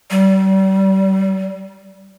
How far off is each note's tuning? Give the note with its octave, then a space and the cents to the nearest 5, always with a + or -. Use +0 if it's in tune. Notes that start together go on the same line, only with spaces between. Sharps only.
G3 -35